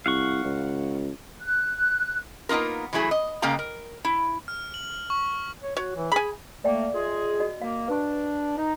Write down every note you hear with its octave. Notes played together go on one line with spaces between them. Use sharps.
C2 F5 F#5 C#6
C#2
F#6
A#3 B3 D#4 F4 A#4
E3 F#3 A3 E4 G#4
D#5
C#3 G#3 A#3 F5 G5 A#5
A#4
E4
F6
F#7
C#6
C#5
F#4 C#5
E3
G#4 G#5 B5
A3 A#3 D5 E5 G5
G#3 F4 G#4
F#4 D#5
A#3 F5
D4 B4 C#6
D#4